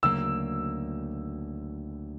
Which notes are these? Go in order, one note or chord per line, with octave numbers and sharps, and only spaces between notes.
D2 C#3 F#3 A#3 E6